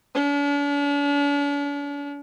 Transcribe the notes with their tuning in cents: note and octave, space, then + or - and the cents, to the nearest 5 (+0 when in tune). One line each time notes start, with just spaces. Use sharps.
D4 -45